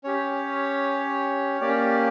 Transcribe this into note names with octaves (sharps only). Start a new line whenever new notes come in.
C#4 G4 C#5
A#3 C#4 G4 D5